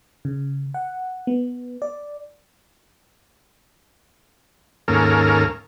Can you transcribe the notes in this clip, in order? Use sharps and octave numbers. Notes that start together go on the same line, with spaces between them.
C#3
F#5
B3
D5
D#2 G#2 A#3 C#4 A4 A#4